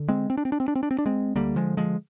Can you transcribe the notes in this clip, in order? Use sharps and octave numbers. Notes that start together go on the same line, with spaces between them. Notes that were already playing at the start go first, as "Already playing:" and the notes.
Already playing: D3
G#3 C4
C4
D4
C4
D4
C4
D4
C4
D4
C4
D4
G#3 C4
D2 D3 G3 A#3
F3 G#3
F3 G#3